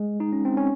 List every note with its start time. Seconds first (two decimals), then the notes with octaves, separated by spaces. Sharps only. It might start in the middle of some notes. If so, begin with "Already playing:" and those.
Already playing: G#3
0.20 D#4
0.33 C#4
0.45 C4
0.57 C#4